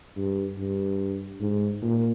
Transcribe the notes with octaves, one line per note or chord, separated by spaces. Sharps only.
G2
G2
G#2
A#2